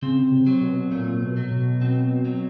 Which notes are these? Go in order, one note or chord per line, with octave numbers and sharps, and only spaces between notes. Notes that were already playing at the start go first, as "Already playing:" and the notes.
C#3 C4
C3
F#3
B2
A#2 A3
A#2
B2
F#3
B2
C4
F#3